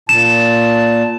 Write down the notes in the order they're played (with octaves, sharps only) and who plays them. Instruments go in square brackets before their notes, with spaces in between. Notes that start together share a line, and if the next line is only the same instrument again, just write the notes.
[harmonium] A#2 A5 [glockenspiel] E7